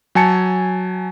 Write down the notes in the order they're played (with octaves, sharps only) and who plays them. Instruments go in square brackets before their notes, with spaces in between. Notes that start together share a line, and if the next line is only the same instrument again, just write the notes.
[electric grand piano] F#3 G#5 A5 C#7